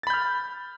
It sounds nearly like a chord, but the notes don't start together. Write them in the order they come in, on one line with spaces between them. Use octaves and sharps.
A6 B5 G6 F6